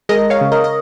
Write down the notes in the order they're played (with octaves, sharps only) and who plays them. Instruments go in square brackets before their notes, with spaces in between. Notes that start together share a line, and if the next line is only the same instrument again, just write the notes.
[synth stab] G#3 A#4 D#5
C#5 F5
C#3
A#4 D#5
D#5